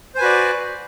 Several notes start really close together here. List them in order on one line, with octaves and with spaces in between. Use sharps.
C5 G#5 B4 F#4 D5